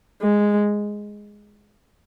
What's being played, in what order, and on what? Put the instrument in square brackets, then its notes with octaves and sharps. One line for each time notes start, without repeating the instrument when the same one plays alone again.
[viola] G#3